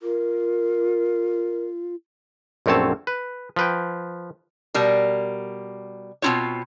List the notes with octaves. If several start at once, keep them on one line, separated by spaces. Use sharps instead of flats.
F4 A#4
A#1 F#2 A3 C4 C#5 A5
B4
F3 B4 G5
B2 G3 A#4
B2 C4 E4 F4 C#5